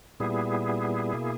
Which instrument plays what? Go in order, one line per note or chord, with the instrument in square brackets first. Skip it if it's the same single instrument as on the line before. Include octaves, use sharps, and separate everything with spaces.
[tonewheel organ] A#2 G3 B3 E4 G#4
B2 A#3